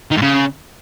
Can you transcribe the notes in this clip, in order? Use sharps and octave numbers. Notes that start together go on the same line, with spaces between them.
D#3
G#2
C#3